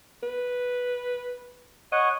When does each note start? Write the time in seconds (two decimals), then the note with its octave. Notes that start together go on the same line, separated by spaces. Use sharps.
0.23 B4
1.92 C#5 D#5 F#5